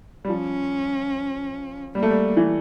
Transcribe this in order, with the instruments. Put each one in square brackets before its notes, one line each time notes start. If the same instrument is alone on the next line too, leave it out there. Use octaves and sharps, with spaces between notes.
[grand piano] G3
[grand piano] F3 [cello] C#4
[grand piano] G3 [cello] A#3
[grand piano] A3
G3
E3